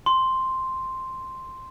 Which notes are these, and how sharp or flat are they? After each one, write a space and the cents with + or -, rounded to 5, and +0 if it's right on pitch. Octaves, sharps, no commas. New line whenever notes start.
C6 +0